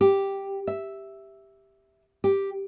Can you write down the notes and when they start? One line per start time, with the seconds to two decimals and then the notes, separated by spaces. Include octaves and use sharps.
0.01 G4
0.67 E5
2.24 G4